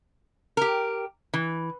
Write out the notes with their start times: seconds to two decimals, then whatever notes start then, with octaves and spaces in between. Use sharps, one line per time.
0.57 G4 A#4
1.34 E3